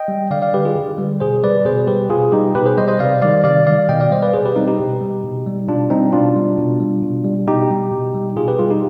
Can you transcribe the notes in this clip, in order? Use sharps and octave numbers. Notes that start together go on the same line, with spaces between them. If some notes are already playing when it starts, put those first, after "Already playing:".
Already playing: D#5 G5
G3
D3 D5 F5
D5 F5
G3 G4 B4
F4 G#4
D3
G3
B2 G#4 C5
G3 B4 D5
B2 G#4 C5
G3 G4 B4
B2 F4 G#4
G3 D#4 G4
B2 G4 B4
G#4 C5
G3 C5 D#5
C5 D#5
C3 D5 F5
D#3 G3 D5 F5
C3 D5 F5
D#3 G3 D5 F5
B2 D#5 G5
D5 F5
G3 C5 D#5
B4 D5
B2 G#4 C5
G4 B4
G3 C4 D#4
D#4 G4
B2
G3
B2
G3
B2 D4 F4
G3 C4 D#4
B2 D4 F4
G3
B2
G3
B2
G3
B2 D#4 G4
G3
B2
G3
B2 F4 G#4
G4 B4
G3 F4 G#4
D#4 G4